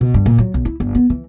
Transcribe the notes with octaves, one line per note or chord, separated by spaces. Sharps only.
B2
G2
A#2
F#3
B1
E4
G1
B3
E3